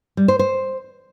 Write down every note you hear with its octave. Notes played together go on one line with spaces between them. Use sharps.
G3
C5
C5